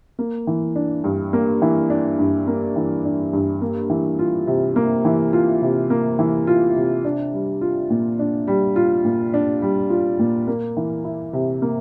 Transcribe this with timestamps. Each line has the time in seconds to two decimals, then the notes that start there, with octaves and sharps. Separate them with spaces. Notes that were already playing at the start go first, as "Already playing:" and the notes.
0.19 A#3
0.47 E3
0.75 D4
1.04 G2
1.33 A#3
1.62 E3
1.90 D4
2.19 G2
2.47 A#3
2.76 E3
3.05 D4
3.33 G2
3.62 A#3
3.90 E3
4.19 F4
4.47 C3
4.76 A#3
5.05 E3
5.33 F4
5.62 C3
5.90 A#3
6.19 E3
6.47 F4
6.76 C3
7.05 D4
7.33 G3
7.61 F4
7.90 A#2
8.19 D4
8.47 G3
8.76 F4
9.05 A#2
9.34 D4
9.62 G3
9.90 F4
10.19 A#2
10.47 A#3
10.77 E3
11.04 E4
11.33 C3
11.62 A#3